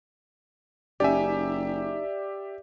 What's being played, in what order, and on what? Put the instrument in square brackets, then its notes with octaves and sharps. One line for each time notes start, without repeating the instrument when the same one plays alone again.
[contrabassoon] F#1 [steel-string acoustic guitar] C#4 D#4 G#5 [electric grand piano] G4 E5 [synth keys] D5